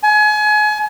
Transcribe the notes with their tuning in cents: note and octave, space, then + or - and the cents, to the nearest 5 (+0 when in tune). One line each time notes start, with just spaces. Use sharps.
G#5 +30